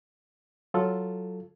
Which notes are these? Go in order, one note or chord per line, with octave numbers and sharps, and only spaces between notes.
F#3 F4 A4